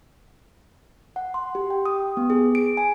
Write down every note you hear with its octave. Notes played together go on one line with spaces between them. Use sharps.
F#5
C6
G4
G5
D#6
B3
G#4
D7
G#5